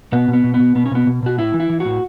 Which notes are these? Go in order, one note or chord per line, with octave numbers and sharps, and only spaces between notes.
B2 B3
B2
B3
B2
B3
B2
B2 B3
C#4
B2 B3
B2
B2 F#4
A2 E4
E3
E4
E3
F#4
A2